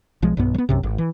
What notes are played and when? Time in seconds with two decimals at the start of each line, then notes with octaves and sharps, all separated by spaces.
0.22 B1 F3 G#3
0.37 B1 G2 B3
0.54 F#3 B3
0.69 B1 F#2 C3
0.83 G#1
0.98 E3